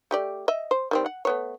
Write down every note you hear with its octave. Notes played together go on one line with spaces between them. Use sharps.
A3 G4 D5
D#5 E5
C5
D#3 G3 C4
F#5
A3 B3 C#5